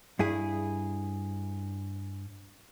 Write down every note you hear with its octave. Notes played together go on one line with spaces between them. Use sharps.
G2 E4 G#4